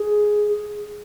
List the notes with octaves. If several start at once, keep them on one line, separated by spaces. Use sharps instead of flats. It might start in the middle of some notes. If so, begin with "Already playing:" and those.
Already playing: G#4